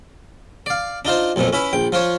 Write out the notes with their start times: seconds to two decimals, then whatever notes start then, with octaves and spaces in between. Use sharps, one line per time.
0.66 D5 F5
1.05 D4 D#4 F4 C5
1.36 B1 F2 A#2 F3 A3
1.53 C#4 E4 B4
1.73 A#1 G5
1.92 F3 F4 C5 C#5